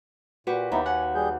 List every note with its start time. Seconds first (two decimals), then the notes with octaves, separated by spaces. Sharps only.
0.47 A#2 F#4 G4 B4
0.72 D#2 B3 D#4 E4
0.86 F#5 G#5
1.15 G3 G#4 G6